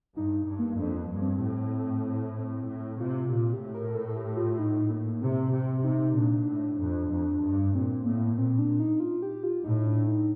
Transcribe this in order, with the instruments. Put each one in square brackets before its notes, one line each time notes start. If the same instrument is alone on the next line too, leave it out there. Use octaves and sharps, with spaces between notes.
[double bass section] G2 [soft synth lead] D#4
[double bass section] G2
[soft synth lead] A#3
[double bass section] F2 [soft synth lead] D4
[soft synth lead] A#3
[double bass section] G2
[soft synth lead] C4
[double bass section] A2
[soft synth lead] C4
C4
[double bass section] A2
[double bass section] C3 [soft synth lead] F4
[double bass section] A#2 [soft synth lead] F4
[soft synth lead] G4
[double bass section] A2
[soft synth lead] A#4
A4
G4
F4
D#4
A#3
[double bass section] C3 [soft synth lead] C4
[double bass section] C3 [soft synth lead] C4
[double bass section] C3 [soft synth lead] D#4
[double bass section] A#2 [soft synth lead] D4
[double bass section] A2
F2
F2
G2
[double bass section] A#2 [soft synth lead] C4
[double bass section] A2 [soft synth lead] A#3
[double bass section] A#2 [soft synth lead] C4
[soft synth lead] D4
D#4
F4
G4
F4
[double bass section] A2 [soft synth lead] D#4
[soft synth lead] D4
D4
D#4